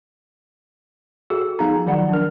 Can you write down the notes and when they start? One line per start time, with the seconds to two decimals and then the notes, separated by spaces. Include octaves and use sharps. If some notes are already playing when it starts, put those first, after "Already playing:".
1.30 F#4 G#4 A4
1.59 F3 B3 D#4 G#4 A#5
1.86 D#3 F3 F#3 D5 F#5
2.09 D4 A#4